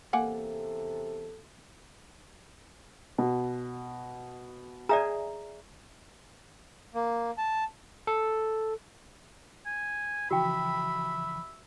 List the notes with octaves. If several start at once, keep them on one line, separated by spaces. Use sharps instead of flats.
E2 C3 A#3 A4 F#5 G#5
B2
G#4 D5 E5 A#5
A#3
A5
A4
G#5
C#3 E3 F3 F#4 E5 G5 B5